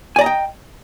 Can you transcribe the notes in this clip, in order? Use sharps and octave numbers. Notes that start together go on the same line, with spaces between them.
D5 D#5 G5 G#5 A#5